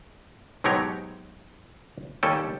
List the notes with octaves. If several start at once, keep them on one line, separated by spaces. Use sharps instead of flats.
G#2 B2 F#3 G4 C#5 A#5
D#2 G3 C#4 A4 G5